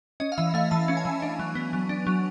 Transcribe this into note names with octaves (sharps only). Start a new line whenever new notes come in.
C#4 D#5
F5
E3 E5
A3 F5
E3 A5
C#4
G#5
E3
D4
F#3
B3
F#3
D4
F#3